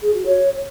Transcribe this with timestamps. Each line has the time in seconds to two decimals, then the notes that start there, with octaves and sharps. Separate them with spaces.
0.02 G#4
0.14 F#4
0.26 C#5